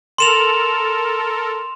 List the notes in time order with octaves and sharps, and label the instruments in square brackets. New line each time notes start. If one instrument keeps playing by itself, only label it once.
[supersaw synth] A4 A#4 [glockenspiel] C6 E7 F7